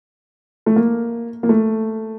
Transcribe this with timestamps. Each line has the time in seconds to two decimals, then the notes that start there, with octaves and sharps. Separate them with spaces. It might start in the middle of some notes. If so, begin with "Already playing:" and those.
0.66 A3
0.76 A#3
1.43 A#3
1.49 A3